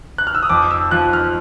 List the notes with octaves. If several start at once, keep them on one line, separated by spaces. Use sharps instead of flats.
F#6
F6
E6
D#6
F2 D6
E6
F3 F#6
F6